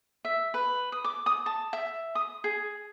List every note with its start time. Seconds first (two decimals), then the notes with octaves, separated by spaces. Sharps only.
0.25 E5
0.54 B4
0.92 D#6
1.04 D6
1.26 D#6
1.46 A5
1.73 E5
2.15 D#6
2.44 G#4